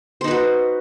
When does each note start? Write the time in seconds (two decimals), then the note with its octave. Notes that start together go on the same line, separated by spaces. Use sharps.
0.21 C5
0.24 D#4
0.28 B4
0.31 F#4